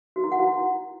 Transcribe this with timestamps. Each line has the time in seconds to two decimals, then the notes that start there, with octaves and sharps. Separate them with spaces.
0.16 F#4
0.24 E4
0.32 F#5
0.39 F#4
0.47 E4